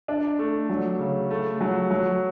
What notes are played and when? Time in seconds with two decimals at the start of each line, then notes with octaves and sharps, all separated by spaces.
0.08 D4
0.39 A3
0.69 F#3
0.99 C#3
1.30 A3
1.61 F#3
1.91 F#3